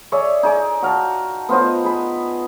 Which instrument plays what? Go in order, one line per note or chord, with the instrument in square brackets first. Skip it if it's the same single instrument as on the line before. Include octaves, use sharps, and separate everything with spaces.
[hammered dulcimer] G#4 C#5 D5 E5
D#4 G#4 D6
F#4 F5 A5
B3 F4 C5 D#5
G#4 B5